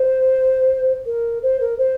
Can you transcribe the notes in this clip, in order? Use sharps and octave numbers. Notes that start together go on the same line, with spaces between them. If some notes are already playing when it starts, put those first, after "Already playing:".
Already playing: C5
A#4
C5
A#4
C5